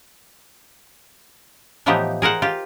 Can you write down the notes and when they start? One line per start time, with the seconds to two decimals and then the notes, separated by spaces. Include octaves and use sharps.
1.86 A2 E3 F3 B3 D#4 G4
2.22 G#4 A#4 C5 F#5
2.42 F4 G4